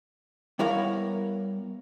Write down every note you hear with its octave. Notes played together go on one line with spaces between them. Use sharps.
G3 B3 E4 A#4 C#5 F5